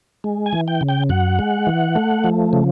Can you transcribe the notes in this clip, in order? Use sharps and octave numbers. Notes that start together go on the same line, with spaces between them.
G#3
G#5
E3
G5
C#3
G5
F#2 F#5
G#3
E3
A3
F3
C#3